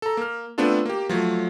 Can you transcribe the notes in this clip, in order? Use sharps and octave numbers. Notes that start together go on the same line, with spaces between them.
A4 A#5
A#3 F6
A3 B3 C4 D4 F4 A4
A#3 G4
F3 F#3 A3